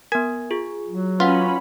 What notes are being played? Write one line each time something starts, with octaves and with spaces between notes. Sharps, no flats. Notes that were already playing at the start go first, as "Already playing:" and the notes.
B3 A#4 G#5
F4 G#4
F#3
C#4 F4 B4 F#5 B5